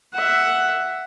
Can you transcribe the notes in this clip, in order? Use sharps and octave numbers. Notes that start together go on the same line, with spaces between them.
E5 F#5